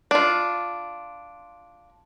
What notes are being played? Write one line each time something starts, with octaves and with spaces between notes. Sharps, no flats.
D4 F4